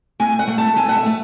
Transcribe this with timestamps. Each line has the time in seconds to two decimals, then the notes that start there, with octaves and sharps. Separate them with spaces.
0.20 A3 G#5
0.39 F#5
0.48 A3
0.58 A5
0.76 A3 G#5
0.89 F#5
0.96 E5
1.06 A3